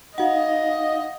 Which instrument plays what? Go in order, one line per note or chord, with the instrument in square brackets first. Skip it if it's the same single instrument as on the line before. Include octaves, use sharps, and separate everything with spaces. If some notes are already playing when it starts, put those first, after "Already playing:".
[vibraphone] D#4 F5 [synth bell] F#4 F#5 [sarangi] D#5